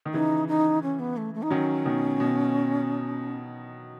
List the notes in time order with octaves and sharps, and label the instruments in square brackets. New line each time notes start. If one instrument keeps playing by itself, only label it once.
[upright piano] D#3
[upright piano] C#3 E3 [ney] D#4
[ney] D#4
C#4
B3
A3
A3
D#4
[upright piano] D#3 F#3 [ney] C#4
[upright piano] B2 D#3
B2